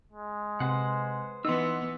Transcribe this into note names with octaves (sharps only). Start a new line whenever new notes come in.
G#3
C3 B4 C5 F#5
E3 B3 D#4 F#5 C6 E6